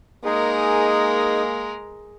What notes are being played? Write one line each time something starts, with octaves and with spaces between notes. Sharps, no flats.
G#3 A#3 D#4 G#4 A#4